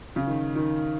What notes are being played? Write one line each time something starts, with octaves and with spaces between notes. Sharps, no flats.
C#3
D#3
D#3